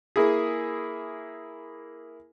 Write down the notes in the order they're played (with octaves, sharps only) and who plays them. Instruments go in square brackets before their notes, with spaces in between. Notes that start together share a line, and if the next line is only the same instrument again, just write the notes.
[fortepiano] A#3 E4 G#4